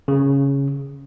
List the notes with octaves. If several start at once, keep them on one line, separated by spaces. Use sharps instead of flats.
C#3